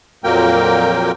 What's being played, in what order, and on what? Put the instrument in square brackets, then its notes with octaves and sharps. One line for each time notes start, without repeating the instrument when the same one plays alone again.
[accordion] F2 A#2 F#3 A#3 A#4 G5